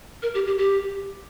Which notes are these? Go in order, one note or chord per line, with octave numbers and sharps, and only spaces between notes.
A#4
G4
G4
G4